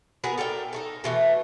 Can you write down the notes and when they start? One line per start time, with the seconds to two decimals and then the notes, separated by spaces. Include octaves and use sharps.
0.24 B3 F#4 G#4 A#4
0.38 A4 A#4 D5 G5
0.73 D#4 F#4 A4
1.04 B2 E3 A3